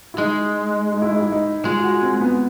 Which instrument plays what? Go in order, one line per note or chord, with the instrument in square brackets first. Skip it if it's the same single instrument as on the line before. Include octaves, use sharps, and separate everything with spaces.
[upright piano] E4
[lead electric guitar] G#3 [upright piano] D#4
[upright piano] D#4
E4
D#4
E4
D#4
[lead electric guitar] G#3 [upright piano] F4
[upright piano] F4
F#4
C4
B3